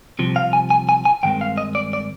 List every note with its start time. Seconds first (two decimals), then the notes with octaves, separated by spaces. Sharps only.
0.19 C2 C3 F3
0.36 F5
0.53 G#5
0.70 G#5
0.89 G#5
1.05 G#5
1.23 G2 D#3 G#3 C4 G5
1.41 F5
1.58 D#5
1.75 D5
1.93 D5